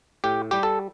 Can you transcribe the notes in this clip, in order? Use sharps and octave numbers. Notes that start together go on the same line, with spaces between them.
A2 G4
G3 G4
A4